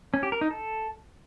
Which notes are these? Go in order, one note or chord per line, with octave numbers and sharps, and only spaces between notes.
C#4
G4
A#4
D#4
A4